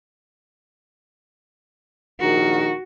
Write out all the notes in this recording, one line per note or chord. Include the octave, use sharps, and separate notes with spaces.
A#1 D#3 F#4 A#4